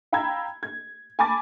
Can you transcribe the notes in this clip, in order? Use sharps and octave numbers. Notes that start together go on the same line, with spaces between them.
F5 G5 A#5 B5 E6 G#6
G#6
G#5 A5 B5 D6 A6